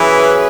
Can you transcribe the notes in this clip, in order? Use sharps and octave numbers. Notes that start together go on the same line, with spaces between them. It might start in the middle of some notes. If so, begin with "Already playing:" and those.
Already playing: E3 F#3 C#4 G#4 B4 E5